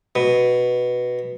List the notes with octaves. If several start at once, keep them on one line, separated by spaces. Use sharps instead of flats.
B2